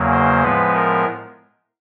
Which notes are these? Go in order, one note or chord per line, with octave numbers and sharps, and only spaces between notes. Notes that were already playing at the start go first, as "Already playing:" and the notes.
Already playing: E2 C#3 F#3 A#3
C5
A2 F3 G#3 B3 B4
A#4